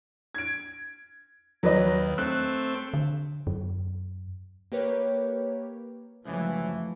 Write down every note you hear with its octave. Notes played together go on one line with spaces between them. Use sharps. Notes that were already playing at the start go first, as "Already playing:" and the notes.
G#6 D7
D#2 F#3 B4 D#5
A3 C4 F#6
D3
F#2
A#3 G4 A#4 B4 C#5
C#2 F#2 E3 F3 A3